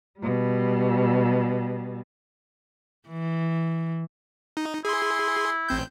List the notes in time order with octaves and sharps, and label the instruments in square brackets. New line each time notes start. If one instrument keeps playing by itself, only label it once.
[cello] B2 G3
[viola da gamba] E3
[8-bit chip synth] D#4
[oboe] E4 [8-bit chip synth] G#4 C6
[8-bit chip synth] A1 C4 G6